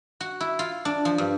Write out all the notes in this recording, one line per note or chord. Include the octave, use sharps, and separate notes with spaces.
F#4
E4
F4
D4
F3
G2